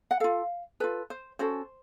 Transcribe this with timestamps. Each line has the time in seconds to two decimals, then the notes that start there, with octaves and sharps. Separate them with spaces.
0.11 F#5
0.20 F4 A4 F5
0.80 F4 A4 B4
1.10 C5
1.39 C#4 F#4 A4 C5